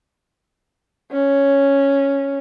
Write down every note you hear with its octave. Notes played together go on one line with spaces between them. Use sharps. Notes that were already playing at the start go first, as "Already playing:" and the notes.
C#4